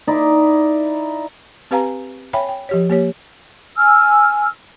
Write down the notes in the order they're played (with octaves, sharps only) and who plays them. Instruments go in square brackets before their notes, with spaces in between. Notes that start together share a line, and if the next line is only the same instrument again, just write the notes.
[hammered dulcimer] D#4 E4 D5
[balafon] C4 G4 B4 F5 G#5 A#5
C#5 E5 G5 G#5 B5
G5
F3 G4 C#5
A#3 G4 C#5
[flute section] G#5 E6 F6